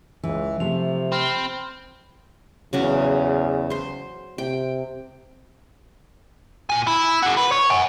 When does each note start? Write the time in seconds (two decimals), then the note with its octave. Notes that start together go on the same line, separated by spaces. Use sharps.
0.23 C#2 E3
0.60 C3 F3 A3 F7
1.12 C4 B5 C6 F6
2.73 E2 C#3 F#3 C#4
3.70 C5 C6
4.38 C3 G5
6.70 A#2 G#5
6.87 E4
7.23 F#4 G#4
7.37 B4
7.52 C#5
7.71 F#5 G#5